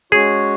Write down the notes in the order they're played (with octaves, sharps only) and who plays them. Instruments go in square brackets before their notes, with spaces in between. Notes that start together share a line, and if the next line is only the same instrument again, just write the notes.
[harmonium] G#3 C#4 F#4 C#5 [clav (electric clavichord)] G#4